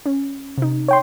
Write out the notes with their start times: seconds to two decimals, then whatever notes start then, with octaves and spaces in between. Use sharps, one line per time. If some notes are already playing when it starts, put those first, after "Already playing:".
0.06 C#4
0.58 C3 D#4
0.88 C#5 G5 C6